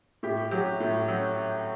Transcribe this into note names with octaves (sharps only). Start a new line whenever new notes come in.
A2 G4
F#3 G4
A2
F#3